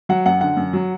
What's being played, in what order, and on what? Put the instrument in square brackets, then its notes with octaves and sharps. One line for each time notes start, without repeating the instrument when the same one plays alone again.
[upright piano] F#3 F#5
F#2 F#5
D3 F#5
F#2
F#3